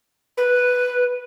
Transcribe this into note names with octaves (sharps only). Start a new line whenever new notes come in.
B4